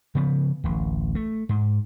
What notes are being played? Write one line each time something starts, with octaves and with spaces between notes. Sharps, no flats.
C#3 F3 B3
D1 A1
A3
G#2